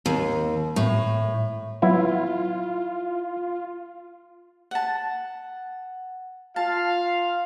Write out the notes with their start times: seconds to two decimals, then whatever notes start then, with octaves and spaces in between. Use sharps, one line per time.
0.06 D#2
0.76 A2
1.82 F#3 B3 E4 F4
4.71 F#5 A5
6.56 F4 F5 A5